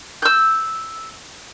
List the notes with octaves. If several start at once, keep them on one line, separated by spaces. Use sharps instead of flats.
E6 G6